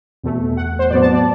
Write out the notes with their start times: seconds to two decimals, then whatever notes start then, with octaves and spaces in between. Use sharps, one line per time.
0.23 E2 B2 A3
0.57 F#5
0.79 C5
0.90 A2 F#3 B3 D5
1.02 A5
1.13 D5